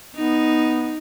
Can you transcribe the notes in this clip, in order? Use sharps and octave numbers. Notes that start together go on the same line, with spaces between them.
B3 D#4